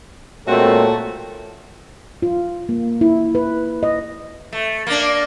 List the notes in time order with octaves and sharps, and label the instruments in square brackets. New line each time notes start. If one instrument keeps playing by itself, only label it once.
[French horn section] A#2 A#4 C#5 [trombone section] G#3 A3 C4 [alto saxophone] F#4 [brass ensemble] A4
[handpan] F4
A#3
E4
B4
D#5
[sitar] A3
A#3 D4